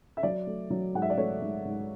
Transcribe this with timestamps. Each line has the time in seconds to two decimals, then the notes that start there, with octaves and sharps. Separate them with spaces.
0.17 E5
0.23 F#3 D5
0.47 A3
0.70 F#3
0.94 G#2 F#5
1.02 E5
1.10 D5
1.18 A3 C#5
1.41 G#2
1.65 G#2